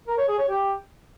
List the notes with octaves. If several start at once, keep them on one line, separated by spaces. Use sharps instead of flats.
A#4
C#5
G#4
C#5
G4